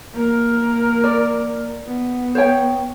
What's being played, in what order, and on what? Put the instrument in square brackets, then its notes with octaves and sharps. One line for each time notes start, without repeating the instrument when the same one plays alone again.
[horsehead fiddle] A#3 A#4
[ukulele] D5
[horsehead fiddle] B3
[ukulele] C5 C#5 G5